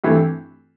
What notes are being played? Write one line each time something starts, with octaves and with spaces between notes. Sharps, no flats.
G2 E3 A3 C4